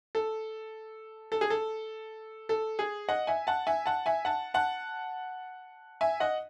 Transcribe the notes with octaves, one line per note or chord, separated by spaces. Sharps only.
A4
A4
G#4
A4
A4
G#4
D#5 F#5
E5 G#5
F#5 A5
E5 G#5
F#5 A5
E5 G#5
F#5 A5
F#5 A5
E5 G#5
D#5 F#5